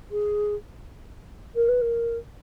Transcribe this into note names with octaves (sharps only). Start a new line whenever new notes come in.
G#4
A#4
B4
A#4